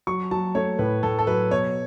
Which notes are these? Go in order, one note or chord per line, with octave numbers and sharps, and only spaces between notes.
F#3 C#6
F#3 A5
A3 C#5
A2 B4
A2 A4
A4
F#3 B4
B2 C#5